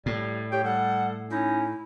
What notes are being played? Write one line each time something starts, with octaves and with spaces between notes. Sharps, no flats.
A2 G3
G4 C#5 G5
G3 A4 F#5
C#4 D#4 E4